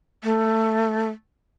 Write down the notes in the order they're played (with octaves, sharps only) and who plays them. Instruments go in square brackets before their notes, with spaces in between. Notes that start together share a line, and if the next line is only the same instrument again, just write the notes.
[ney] A3